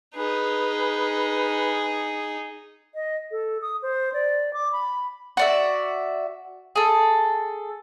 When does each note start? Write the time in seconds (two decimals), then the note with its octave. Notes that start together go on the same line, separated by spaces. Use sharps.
0.16 D#4 G#4 B4
2.95 D#5
3.31 A4
3.62 D#6
3.82 C5
4.13 D5
4.53 D6
4.72 B5
5.37 F#4 D5 E5
6.76 G#4 A4